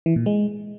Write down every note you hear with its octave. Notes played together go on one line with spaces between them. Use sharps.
E3
A#2
G#3